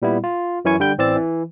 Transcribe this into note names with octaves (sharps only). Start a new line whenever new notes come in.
A#2 G3 B3 E4
F4
F#2 E3 C#4 E4 G#5 C#6
D3 G3 G5 G6
A1 E3 C4 D5 E6 A6
E3